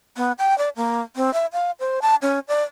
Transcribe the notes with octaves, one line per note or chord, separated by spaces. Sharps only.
B3
G5
D5
A#3
C4
E5
F5
C5
A5
C#4
D5